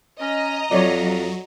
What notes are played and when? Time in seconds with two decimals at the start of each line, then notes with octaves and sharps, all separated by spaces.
0.21 C#4 D#5 A#5
0.71 F2 F#3 C#5 D5